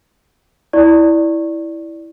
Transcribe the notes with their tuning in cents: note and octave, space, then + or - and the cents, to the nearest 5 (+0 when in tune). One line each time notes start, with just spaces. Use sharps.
E4 -5 D5 -5 C#6 -15